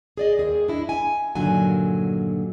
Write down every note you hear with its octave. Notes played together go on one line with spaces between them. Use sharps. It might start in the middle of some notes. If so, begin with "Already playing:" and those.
G#4 D5 D#5
D#2 G#4
D4 E4 D#5
G#5
G2 A#2 D3 D#3 F#3 G#5